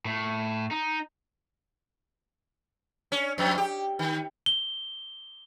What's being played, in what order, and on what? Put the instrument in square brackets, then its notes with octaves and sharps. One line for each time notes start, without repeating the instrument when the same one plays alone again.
[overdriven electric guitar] A2
D#4
[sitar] C#4
F2
G4
D#3
[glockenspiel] G7